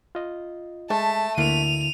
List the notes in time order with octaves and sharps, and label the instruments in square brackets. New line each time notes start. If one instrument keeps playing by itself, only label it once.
[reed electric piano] F4 D#5
[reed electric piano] G#3 [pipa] A3 [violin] A5
[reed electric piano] D2 [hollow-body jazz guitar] D3 A#3 E4 [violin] D#7 F7